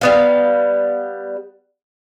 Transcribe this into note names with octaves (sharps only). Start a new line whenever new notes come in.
G3 B3 F5